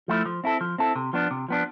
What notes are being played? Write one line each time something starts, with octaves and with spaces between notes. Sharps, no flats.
F3 A3 E4
F3
C4 E4 A4
F3
C4 E4 A4
C3
F3 B3 D4
C3
F3 B3 D4